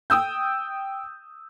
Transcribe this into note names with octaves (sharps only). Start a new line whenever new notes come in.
G5 D#6 E6 G6